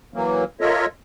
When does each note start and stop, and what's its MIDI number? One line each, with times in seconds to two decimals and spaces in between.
0.14 0.44 52
0.14 0.44 54
0.14 0.44 58
0.61 0.86 65
0.61 0.86 69
0.61 0.86 70
0.61 0.86 73
0.61 0.86 75
0.61 0.86 76